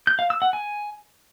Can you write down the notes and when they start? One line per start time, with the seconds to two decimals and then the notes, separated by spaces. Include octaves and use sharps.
0.07 G6
0.19 F5
0.30 E6
0.42 F#5
0.53 G#5